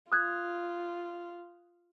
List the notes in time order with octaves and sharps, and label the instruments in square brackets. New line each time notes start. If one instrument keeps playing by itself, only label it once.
[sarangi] F4 [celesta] D#6 F#6 G#6